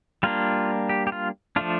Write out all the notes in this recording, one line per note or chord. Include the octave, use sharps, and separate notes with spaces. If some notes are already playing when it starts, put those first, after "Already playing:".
G3 A#3 D4 F4
G4
G4
F4
F3 A3 D4 F4